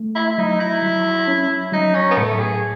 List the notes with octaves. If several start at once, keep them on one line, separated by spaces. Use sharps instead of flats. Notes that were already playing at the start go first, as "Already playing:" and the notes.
Already playing: A3
E4
E4
F#3 D#4
E4
F#3
C#4
F#3 D#4
C#4
B3
A2 A3
G#4